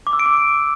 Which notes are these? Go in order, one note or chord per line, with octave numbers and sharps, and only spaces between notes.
D6
E6
D7
D6